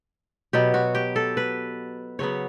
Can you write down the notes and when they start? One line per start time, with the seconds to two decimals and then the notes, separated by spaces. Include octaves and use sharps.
0.53 B2 F#3 B3 G4
0.74 F#4
0.95 G4
1.16 A4
1.37 B4
2.19 C#3 F#3 B3 C#5